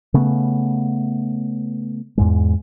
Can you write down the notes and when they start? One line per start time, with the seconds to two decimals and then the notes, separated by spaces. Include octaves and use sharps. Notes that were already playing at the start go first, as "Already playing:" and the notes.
0.14 C#3 A3 B3
2.18 E2 G#2 G#3